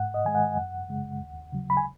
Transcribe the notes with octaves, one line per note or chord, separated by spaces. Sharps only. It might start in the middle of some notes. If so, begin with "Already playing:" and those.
Already playing: G#2 F#5
D#5
D#3 G#3 G#5
F#5
F#2
C#3 G#3
D#2
C#3 F#3
B5
G#5